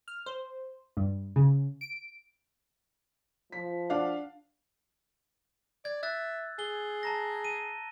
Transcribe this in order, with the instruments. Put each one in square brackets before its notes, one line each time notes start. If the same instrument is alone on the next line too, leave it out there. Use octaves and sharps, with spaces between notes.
[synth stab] F6
C5
G2
C#3
D7
[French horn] F3 [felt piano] B6
[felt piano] D4 F5 F#5
[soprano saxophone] D5 [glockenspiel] G#6
[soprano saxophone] E5 [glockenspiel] E6 F#6 A6
[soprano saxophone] G#4 [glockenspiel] G7
[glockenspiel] A5 A#5 A#6
D#7